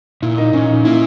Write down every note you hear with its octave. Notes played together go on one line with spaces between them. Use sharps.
A#2 E4
D#4
A#2 C#4
D#4
A#3 E4